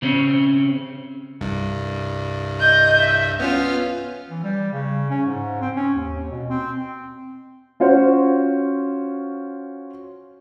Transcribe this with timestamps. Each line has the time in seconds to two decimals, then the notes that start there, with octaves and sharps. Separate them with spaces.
0.02 C#3 C4 C#4
1.41 C2 G2
2.60 D#5 G6
2.98 E5
3.40 B3 C#4 F4 F6
4.30 E3
4.43 G3
4.72 C#3
5.10 C#4
5.26 G#2
5.61 C4
5.76 C#4
5.94 D#2
6.31 B2
6.49 C4
7.80 C#4 F4 F#4 C5 C#5